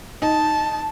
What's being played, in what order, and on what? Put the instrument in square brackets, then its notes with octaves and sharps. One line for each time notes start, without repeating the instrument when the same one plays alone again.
[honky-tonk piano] D#4 [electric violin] A5